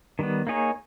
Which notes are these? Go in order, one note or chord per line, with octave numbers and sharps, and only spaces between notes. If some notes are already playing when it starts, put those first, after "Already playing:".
D#3 G3 B3
A#3 D#4 G#4 C#5